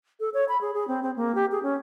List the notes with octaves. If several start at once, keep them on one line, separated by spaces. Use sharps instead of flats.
A4
C#5
B5
G#4
G#4
C4
C4
A#3
G4
G#4
C#4